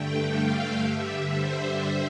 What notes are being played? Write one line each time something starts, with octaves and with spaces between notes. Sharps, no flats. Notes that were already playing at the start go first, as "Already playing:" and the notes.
Already playing: G2 D3 A3 G5
F5
G2 D3 G3 E5
C5